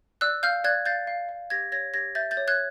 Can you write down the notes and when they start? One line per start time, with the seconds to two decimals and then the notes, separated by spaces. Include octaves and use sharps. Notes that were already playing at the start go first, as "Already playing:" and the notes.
0.21 D5 E6 F#6
0.43 F5 F6 G6
0.64 D5 F#6 G#6
0.86 F5 G6 A6
1.07 F5
1.29 F5
1.50 G4 G#6 A#6
1.72 C#5 G#6 A#6
1.94 G4 G#6 A#6
2.15 E5 G6 A6
2.31 G6 A6
2.37 C#5
2.48 F#6 G#6